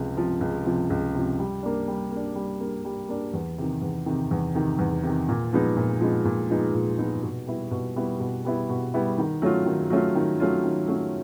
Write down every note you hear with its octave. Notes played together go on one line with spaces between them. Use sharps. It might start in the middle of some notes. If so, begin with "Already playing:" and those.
Already playing: C#2 C3 F3
C3 F3
C#2
C3 F3
C#2
C3 F3
G3
A#3 D4
G3
A#3
D4
G3
A#3 D4
G3
A#3 D4
E2
C3 D#3
E2
C3 D#3
E2
C3 D#3
E2
C3 D#3
A#2
F3 G#3 B3 D#4
A#2
F3 G#3 B3 D#4
A#2
F3 G#3 B3 D#4
A#2
F3 G#3 B3 D#4
B2
G3 B3 E4
B2
G3 B3 E4
B2
G3 B3 E4
B2
G3 B3 E4
D#3
F#3 A3 C#4 F4
D#3
F#3 A3 C#4 F4
D#3
F#3 A3 C#4 F4
D#3
F#3 A3 C#4 F4